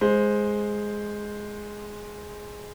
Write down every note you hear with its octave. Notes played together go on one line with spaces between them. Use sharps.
G#3 C5